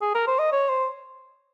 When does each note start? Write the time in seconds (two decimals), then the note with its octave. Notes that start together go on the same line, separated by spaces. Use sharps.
0.02 G#4
0.14 A#4
0.27 C5
0.39 D#5
0.52 C#5
0.69 C5